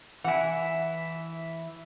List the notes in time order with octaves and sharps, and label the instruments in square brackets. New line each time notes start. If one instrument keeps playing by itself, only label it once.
[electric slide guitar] E3 E4 [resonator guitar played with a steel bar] F#5 G#5